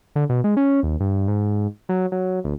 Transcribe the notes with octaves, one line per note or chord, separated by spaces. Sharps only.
D3
B2
G#3
C#4
D#2
G2
G#2
F#3
F#3
D2